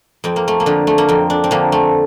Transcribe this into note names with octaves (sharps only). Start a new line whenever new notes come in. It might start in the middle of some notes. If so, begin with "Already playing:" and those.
F2 C4
A#3
A3
A#3
D3 F3
A3
A#3
F2 C4
D4
C4
D3 F3 A#3
A3